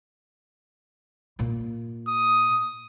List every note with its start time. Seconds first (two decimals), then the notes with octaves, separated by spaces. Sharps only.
1.39 A#2 A#3
2.07 D#6